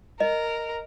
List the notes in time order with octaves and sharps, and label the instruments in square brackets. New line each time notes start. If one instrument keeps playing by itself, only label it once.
[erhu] A#4 [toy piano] D#5